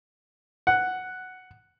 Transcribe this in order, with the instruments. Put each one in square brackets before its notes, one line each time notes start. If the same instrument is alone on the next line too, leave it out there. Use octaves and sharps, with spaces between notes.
[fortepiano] F#5